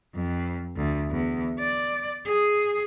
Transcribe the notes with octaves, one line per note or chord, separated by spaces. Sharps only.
F2
D2
E2
D5
G#4